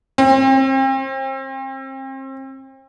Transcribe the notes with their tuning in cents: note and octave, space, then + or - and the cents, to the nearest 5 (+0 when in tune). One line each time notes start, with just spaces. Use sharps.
C4 +35